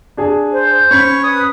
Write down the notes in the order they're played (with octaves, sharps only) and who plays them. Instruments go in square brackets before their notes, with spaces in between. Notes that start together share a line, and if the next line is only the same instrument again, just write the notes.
[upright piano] D4 G#4 G#5
[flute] C5
[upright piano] C#4 B5 B6 [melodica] C#5 C#6
[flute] B4 [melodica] D#6